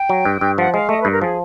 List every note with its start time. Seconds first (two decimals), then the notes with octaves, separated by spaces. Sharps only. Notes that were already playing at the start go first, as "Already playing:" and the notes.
Already playing: G5
0.09 F#3
0.25 G2
0.41 G2
0.58 F3 F#5
0.74 G#3 F5
0.89 A3 D#5
1.00 B4
1.05 G2
1.10 A#4
1.22 F3 G#4